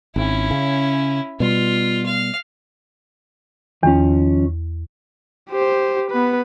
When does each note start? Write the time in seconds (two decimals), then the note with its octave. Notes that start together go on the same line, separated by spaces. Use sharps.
0.16 G#1 C#4 E4
0.51 C#3
1.40 B2 G3 F4
2.06 F5
3.83 E2 D#3 F3 C#4
5.50 G4 C5
6.11 B3 B4